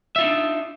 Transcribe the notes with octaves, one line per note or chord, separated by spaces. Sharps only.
D4 D#4 F4 E5